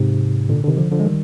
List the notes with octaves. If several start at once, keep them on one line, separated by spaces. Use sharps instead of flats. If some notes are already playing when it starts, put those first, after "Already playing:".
Already playing: G#2 C3
A#2 D3
D3
C3 D#3
D3 F3
D3 F3
G#3
D#3 G3